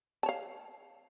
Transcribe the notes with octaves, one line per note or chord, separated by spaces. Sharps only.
C#5 F5 A5